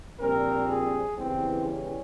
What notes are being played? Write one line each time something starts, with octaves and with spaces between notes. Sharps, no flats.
A#1 A#2 G3 C4 A#4
G#4
E2 C#3 E3 G3 C4
C#4